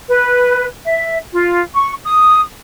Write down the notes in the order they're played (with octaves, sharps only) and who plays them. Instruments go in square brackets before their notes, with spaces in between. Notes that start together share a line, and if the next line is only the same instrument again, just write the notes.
[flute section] B4
E5
F4
C#6
D#6